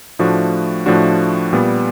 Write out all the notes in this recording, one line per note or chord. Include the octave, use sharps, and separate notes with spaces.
A2 F3 A3 D4 F#4
A2 F3 A3 D4 F#4
A#2 G3 B3